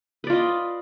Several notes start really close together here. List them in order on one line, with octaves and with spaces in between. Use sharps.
B4 D5 F4 D#5